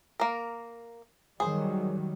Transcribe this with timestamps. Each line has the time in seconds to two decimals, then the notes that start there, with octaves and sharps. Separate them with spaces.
0.20 A#3 A#4
1.40 D#3 F#3 G3 G#4 C5